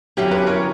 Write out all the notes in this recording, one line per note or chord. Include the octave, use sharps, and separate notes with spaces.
E2 D3 F#3 C#4 E4 G4
G4 B4
A#4 C#5